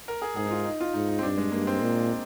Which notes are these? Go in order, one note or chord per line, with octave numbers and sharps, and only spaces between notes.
A#4
G#4
G#2 G#4
D#4
F4
D#4
F4
G#2 D#4
D#4
C4
G2 D4
G#3
G2 A#3
C4
A#2